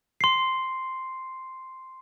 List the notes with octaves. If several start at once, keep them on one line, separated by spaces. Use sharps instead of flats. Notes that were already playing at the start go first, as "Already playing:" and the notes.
C6 C7